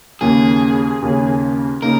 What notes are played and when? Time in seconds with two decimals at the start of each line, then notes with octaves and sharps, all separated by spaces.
0.21 D#2 C#3 A#3 C#4 G#4
1.02 D#2 C#3 A#3 C#4
1.82 C#3 A#3 D#4 A#4